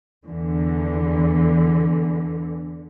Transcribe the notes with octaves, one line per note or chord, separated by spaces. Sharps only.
E2 D3 E3